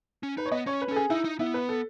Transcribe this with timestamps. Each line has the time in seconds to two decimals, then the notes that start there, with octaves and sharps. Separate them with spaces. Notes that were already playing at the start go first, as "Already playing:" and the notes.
0.23 C#4
0.37 D#4 B4
0.46 C#5
0.52 B3 D#5
0.66 C#4 C#5
0.82 B4
0.88 C#4 A4
0.96 G#4
1.10 D#4 E4
1.25 D#4
1.39 B3 E4
1.54 B4
1.69 A4